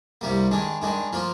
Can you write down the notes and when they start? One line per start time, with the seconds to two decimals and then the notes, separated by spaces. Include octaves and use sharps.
0.21 C2 C3 G3 A#3
0.51 D#3 G#3 D4
0.82 D#3 G#3 D4
1.13 F3 A#3 F4